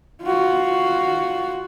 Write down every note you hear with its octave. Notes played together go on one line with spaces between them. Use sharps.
F4 F#4